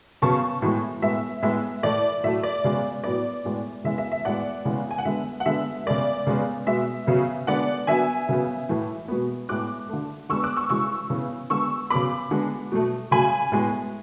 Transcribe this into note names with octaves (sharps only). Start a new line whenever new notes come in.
C#3 F#3 B3 A5 C#6
A2 E3 G#3 B3
A2 G#3 B3 E5
A2 G#3 B3 E5
A2 E3 A3 D5
A2 F#3 A3 E5
D5
C#3 G#3 B3
A2 F#3 B3 D5
A2 G#3 B3
C#3 E3 G#3 B3 E5
E5
E5
A2 G#3 B3 D5 F#5
C#3 E3 G#3 B3
G#5
F#5
D3 G#3 B3 E5
F#5
D3 G#3 B3 E5
C#3 G#3 B3 D5
C#3 G#3 B3
B2 G#3 B3 E5
C#3 F#3 B3
D3 G#3 B3 D5 F#5
D3 F#3 B3 E5 G#5
C#3 F#3 B3
A2 E3 A3
B2 G#3 B3
A2 G#3 B3 D6 F#6
D3 A3
D3 G#3 B3 C#6 E6
D6 F#6
C#6 E6
C#3 E3 G#3 C#6 E6
C#3 E3 B3
D3 G#3 B3 C#6 E6
C#3 F#3 B3 B5 D6
D3 G#3 B3
B2 F#3 A3
C#3 F#3 A3 G#5 B5
A2 G#3 B3